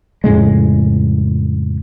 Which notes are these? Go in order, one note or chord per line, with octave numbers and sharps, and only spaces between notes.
F2 A2 C#3 G#3